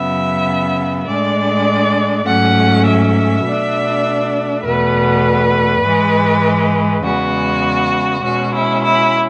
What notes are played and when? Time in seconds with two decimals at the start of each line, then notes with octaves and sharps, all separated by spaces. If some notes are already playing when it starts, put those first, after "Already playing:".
Already playing: F#2 C#3 F#3 B3 E5
1.07 A2 G#3 D4 D5
2.26 G#2 F#3 A3 C#4 F#5
2.86 E5
3.46 B2 A3 D4
4.65 E2 B2 A3 B4
5.84 G#2 E3 G#3
7.04 E2 C#3 G#3 B3 F#4
8.23 B2 G#3 C#4 F#4
8.54 E4
8.83 E4